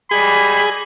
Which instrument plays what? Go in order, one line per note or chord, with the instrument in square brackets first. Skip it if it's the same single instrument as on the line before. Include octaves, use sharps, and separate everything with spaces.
[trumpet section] G3 G#3 B5 [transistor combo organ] G#4